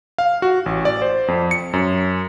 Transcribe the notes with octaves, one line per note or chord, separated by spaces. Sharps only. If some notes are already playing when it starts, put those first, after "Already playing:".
F5
F#4
A1
D5
C5
F2
C#7
F#2